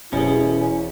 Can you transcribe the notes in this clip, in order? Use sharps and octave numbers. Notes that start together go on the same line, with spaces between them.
E1 B2 C#4 E4 G4 G#4